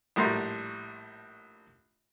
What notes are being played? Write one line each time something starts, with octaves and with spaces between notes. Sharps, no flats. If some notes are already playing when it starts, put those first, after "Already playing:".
A#1 A2 G3 F#4 A#5 C6